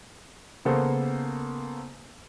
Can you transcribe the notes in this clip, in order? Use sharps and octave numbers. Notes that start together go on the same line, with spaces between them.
C#3 A#3 B3 A4 A#4 C5